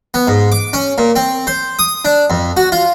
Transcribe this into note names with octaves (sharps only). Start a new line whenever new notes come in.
B3
G#2
D6
C#4
A#2
C4
C5
D#6
D4
F2
F#4
F4